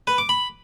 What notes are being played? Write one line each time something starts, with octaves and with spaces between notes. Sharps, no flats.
B4
D6
B5